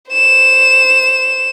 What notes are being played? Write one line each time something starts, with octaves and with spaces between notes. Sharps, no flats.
C5 E7